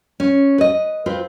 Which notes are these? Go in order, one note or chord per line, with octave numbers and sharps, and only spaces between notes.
C#4
B4 D#5
C4 F4 B4